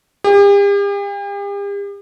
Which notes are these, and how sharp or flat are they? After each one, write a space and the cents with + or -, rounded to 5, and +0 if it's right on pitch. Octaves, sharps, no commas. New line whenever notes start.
G4 +45